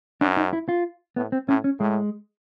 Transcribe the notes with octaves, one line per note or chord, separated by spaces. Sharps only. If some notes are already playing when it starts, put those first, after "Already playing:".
F#2 D4
D#4
E4
F4
A2 B3
C4
A2 C#4
C#4
A2 G#3